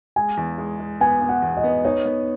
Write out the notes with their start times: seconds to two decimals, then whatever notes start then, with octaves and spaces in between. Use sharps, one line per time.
0.16 G#3 G#5
0.37 E2
0.58 G#3
0.79 G#3
1.01 B3 G#5
1.21 B3
1.29 F#5
1.42 E2
1.57 D#5
1.64 B3
1.84 D#4 C#5
2.05 B3